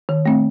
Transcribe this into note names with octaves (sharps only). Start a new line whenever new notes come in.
D#3
A3 C4